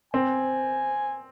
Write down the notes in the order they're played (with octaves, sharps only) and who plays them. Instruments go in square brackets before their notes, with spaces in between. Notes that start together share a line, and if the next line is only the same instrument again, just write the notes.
[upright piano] C4 [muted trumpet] G#5